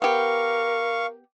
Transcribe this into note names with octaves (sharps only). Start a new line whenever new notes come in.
B3 G4 A#4 F5 C#6